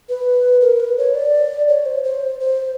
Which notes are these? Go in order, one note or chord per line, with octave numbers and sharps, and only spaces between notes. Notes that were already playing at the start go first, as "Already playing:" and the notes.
B4
A#4
B4
C#5
D5
C#5
C5
C5
C5